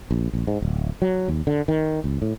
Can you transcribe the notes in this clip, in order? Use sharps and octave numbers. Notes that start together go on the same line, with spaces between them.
A#1
A#1
G#2
D1
F#3
D#2
D3
D#3
C#2
A2